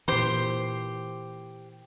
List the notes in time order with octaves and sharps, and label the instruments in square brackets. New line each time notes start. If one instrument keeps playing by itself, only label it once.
[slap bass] A#2 E3 [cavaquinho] G4 C5 C6